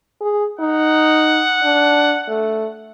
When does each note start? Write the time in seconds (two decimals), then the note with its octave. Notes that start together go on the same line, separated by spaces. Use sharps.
0.21 G#4
0.60 D#4 F#5
1.64 D4
2.28 A3